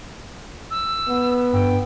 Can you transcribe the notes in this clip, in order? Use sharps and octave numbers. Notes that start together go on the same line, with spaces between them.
E6
B3
G2 G5